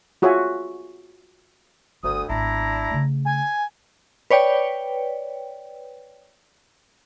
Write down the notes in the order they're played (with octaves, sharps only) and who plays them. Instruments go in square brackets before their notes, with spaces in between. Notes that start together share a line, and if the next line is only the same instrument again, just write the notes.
[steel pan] F4 F#4 G#4 C#5 E5 G#5
[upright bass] G1 [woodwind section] D2 D#6
[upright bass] G#1 B3 [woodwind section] D4 E4 A#5
[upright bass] C#3 A3
[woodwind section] G#5
[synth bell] B4 C#5 D5 G5